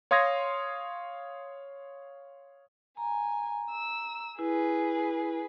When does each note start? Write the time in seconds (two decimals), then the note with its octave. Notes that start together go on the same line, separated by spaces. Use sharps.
0.11 C#5 F5 C6 D#6 G#6 A#6
2.97 G#5 A#5
3.69 E6
4.39 E4 G#4 B4